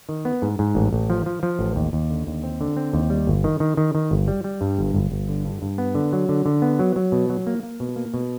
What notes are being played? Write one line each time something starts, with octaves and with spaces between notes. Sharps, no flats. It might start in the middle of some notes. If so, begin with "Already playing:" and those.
D#3
B3
G#2
G#2
A1
A1
F3
F3
F3
A1
D#2
D#2
D3
D#2
C4
D3
C4
D#2
G3
G1
D#3
D#3
D#3
D#3
G1
G3
G3
G2
G1
G1
G1
D3
G2
G2
B3
D3
F#3
D3
D3
B3
F#3
F#3
B2
F#3
A#3
A#3
B2
A#3
B2